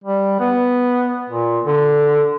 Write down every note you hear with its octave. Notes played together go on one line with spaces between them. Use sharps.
G3
B3
A#2
D3